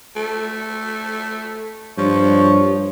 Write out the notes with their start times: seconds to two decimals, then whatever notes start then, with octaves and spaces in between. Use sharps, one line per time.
0.16 A3
1.98 G2 F3 C#5